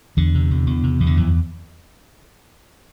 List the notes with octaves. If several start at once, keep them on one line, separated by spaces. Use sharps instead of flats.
E2 D3
C3
E2
E2
C3
E2
D3
F2 E3